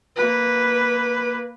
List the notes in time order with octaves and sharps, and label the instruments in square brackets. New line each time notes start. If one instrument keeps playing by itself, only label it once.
[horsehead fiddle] A#3 B4